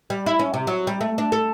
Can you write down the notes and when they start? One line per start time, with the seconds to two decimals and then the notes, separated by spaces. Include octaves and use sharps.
0.10 G3
0.26 E4
0.39 C#4
0.54 C3
0.67 F#3
0.87 G3
1.01 A3
1.18 D4
1.32 A4